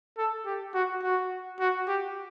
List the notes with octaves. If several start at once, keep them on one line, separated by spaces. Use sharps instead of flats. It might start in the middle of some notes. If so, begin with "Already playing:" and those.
A4
G4
F#4
F#4
F#4
G4